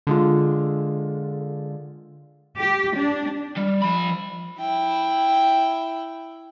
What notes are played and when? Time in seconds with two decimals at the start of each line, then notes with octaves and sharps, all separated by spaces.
0.07 D3 G#3 F4
2.58 G4
2.96 D4
3.57 G3
3.82 F3 B5
4.60 E4 G5